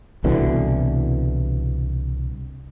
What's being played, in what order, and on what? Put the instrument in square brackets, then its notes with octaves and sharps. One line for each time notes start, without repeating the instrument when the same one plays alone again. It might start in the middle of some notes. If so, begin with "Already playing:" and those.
[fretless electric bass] C2 B2 D3 E3